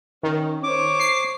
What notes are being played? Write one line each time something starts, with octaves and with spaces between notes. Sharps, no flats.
D#3 C#4
C5 C#5 D6
C7